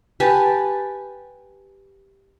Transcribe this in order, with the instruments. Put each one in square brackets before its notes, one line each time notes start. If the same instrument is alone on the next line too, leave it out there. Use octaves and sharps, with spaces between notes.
[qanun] G4 B4 G#5 A5